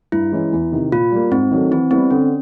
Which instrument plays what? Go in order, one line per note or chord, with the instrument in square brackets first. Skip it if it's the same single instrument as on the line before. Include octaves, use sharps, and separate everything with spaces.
[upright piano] G2 [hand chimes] E4
[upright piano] E3 G#3 C#4
E2
C3 D#3
[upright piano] A#2 [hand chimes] F4
[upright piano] G3 A#3
[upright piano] G#2 [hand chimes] C4
[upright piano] D#3 F#3 A3
[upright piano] E3 [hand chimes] C4
[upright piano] G3 B3 E4 [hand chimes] C4
[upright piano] D3 [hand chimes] C#4